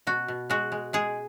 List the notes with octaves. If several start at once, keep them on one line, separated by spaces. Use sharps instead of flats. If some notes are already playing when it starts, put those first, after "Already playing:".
B2 F#4
B2
G#3 F#4
G#3
G#3 G#4